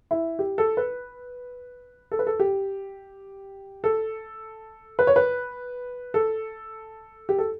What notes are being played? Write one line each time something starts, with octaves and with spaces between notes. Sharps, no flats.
E4
G4
A4
B4
A4
B4
A4
G4
A4
B4
C#5
B4
A4
G4
A4